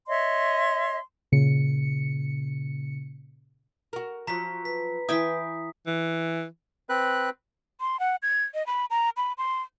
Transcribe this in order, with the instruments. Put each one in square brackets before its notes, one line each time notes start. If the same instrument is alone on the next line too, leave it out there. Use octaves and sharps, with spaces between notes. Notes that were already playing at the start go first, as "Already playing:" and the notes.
[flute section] C#5 D#5 E5 C6
[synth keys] A#2 C#3 C#7
[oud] F#4 A#4
[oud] F3 F#3 [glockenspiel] A#5 B6
[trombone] B4 [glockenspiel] B6
[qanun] E3 G5 G#5 [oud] E5 [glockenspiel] D#6 B6
[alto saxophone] E3
[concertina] C4 B4 F#6
[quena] C6
F#5
G#6
D#5
B5
A#5
B5
C6